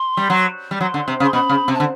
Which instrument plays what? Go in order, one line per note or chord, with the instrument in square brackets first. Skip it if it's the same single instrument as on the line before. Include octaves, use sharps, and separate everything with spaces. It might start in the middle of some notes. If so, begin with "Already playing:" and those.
Already playing: [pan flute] C6
[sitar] G3
F#3
G3
[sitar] F#3 [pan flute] C6
[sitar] D3
C3
C#3
[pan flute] C6
[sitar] B2 [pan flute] B5
[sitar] C#3
C3
[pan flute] A5
[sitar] D3